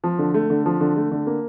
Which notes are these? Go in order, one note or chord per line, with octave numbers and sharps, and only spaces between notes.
F3
D3
A3
D3
F3
D3
A3
D3
A#3